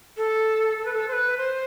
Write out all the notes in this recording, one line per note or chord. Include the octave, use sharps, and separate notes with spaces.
A4
A4
B4
A4
C5
B4
C5